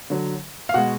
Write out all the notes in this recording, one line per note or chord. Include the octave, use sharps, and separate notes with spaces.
D3 F#3
F5
B2 G#3 F#4 F#5